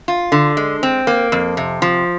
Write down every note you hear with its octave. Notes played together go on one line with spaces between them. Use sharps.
F4
D3
G#3
C4
A#3
F2
C3
F3